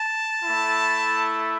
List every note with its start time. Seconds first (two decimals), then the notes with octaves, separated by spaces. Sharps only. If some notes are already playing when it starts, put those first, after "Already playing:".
Already playing: A5
0.44 A3 E4